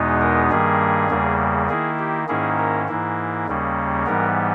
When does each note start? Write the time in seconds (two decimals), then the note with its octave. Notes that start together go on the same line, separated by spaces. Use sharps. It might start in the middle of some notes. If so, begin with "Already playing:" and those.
Already playing: E2 B2 G#3 B3 D#4
0.21 A#4
0.50 G2 D#3 G3 A#3 G#4
1.10 E2 C#3 G3 A#3
1.69 D#3 A#3 E4 G#4
1.99 G4
2.28 G#2 D#3 A#3 C#4 E4 G#4
2.59 A#4
2.88 G#2 E3 A#3 E4
3.47 D#2 C#3 G3 A#3 C#4
4.06 G#2 E3 G3 B3 A#4